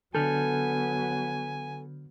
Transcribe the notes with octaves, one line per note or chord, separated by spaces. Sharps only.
D3 F#3 B3 A4 G#5 F6 G6